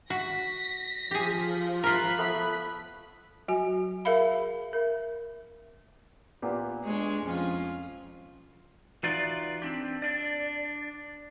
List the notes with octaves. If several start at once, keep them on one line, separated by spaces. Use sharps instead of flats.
F#4 A#6 B6
F3 G4 G#4
F4 A#4 B5 F#6
A3 B3
F#3 F#4 G#5
G#4 A#4 E5 F5 B5
A#4 E5
A#2 B3 G4
G#3 D4 C#5
F2 C#4 F4
E3 D#4 F4 F#4 D5
C4 D4 G4
D4 D5